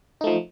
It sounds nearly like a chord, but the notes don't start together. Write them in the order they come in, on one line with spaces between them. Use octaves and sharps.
D#4 A3 F3